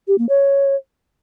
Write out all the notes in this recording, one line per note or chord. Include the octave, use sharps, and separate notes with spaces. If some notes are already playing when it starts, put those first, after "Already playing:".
G4
A#3
C#5